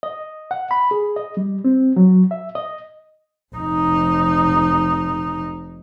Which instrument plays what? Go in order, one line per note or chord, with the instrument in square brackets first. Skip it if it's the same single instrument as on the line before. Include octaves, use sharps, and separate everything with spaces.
[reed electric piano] D#5
F#5
B5
G#4
D#5
G3
C4
F#3
E5
D#5
[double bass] F1 D#4